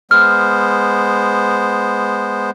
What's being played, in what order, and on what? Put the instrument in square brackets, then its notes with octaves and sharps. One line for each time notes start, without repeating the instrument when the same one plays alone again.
[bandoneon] G#3 B3 C5 [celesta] F6